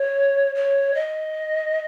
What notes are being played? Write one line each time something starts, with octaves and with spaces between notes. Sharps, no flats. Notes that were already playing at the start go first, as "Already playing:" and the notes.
Already playing: C#5
C#5
D#5